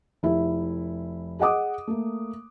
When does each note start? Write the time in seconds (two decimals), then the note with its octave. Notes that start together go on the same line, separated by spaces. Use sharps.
0.23 F1 E4 E5
1.39 G#4 D#5 F#5 D6 D#6
1.87 A3 A#3